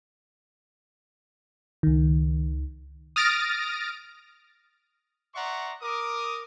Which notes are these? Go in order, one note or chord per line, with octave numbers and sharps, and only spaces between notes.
C#2 D#3
D#6 F6 A6 A#6 D7
D5 E5 F#5 A#5 C6 C#6
A#4 D6 D#6